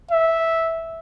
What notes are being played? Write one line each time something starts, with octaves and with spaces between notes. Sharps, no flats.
E5